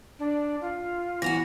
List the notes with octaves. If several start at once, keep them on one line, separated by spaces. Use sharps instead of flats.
D4
F4
E3 B3 F#4 A#6 F7